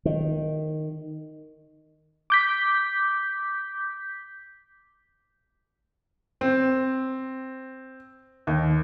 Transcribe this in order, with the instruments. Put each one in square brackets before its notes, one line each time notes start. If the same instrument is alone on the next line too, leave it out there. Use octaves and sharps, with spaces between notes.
[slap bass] D#3
[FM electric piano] D6 G6 B6
[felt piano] C4
D#2